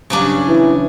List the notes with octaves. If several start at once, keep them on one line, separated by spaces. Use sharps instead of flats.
G2 C#3 F#3 D4
E3